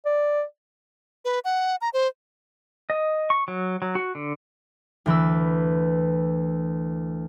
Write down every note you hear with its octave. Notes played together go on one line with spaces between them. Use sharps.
D5
B4
F#5
A#5
C5
D#5
C#6
F#3
F#3
F#4
D3
D2 E3 B4 E6